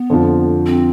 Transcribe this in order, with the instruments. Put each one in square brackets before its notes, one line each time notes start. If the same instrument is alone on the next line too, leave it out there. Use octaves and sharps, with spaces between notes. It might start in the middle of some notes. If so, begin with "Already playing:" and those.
Already playing: [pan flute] B3
[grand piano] F2 D3 F3
[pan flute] C4